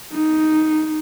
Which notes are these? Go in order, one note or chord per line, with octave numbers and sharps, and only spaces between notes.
D#4